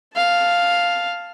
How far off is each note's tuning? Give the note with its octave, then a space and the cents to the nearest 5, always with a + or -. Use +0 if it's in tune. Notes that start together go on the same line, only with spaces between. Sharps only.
F5 +0 A5 +0